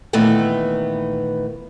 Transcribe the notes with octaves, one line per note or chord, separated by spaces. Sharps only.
A#2 D#3 E3 A3 B3